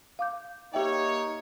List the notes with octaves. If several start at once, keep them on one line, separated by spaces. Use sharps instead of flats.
F5 D6 G6
A#3 D#4 G4 C#5 E5 G5